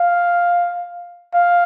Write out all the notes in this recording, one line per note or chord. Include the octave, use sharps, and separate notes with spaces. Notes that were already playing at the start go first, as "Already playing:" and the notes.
Already playing: F5
F5